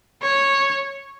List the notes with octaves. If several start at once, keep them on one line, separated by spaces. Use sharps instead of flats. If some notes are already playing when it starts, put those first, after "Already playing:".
C#5